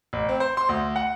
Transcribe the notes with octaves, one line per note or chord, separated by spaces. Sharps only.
A1
C4
C5
C6
D2
F#5